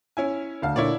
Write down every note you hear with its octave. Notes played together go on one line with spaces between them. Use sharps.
C#4 E4 G#5
D2 F5 A5
A#2 D3 E4 C#5 D5